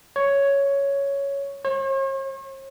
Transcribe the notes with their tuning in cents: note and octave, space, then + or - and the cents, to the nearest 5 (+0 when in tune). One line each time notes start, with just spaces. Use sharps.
C#5 +5
C#5 -45